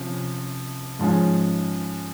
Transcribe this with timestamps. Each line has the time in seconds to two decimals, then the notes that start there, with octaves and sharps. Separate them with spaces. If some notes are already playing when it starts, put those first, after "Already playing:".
Already playing: C3 F3 C#4
0.99 G#2 F3 G#3 C#4